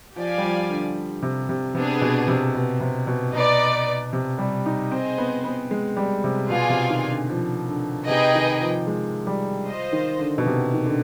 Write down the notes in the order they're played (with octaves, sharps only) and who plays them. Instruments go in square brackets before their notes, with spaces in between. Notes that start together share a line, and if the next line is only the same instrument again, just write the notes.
[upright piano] F3 [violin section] G4 D5 F5 G#5
[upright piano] G3
F3
D3
C3
C3
[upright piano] C3 [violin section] B3 D4 G#4
[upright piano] B2
C3
B2
C3
B2
[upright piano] B2 [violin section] D#4 B4 D5
[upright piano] C3
G3
D#4
[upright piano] C4 [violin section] G#4 C5 D#5
[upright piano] B3
B3
G#3
G3
C3
[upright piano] B2 [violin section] F4 G#4 D5 F5 G#5
[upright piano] C3
D#3
D3
F3
D3
[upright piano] C3 [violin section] D#4 G#4 B4 D#5 G5
[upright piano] D#3
F3
G#3
G3
[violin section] F4 C5 D#5
[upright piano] D#3
D3
B2
C3
D#3
D3